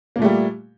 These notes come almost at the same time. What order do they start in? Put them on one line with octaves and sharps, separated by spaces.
A#3 A#2 A3 G3